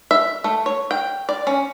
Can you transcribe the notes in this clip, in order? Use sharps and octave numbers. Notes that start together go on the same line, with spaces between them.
E5
A3
C#5
G5
D5
C#4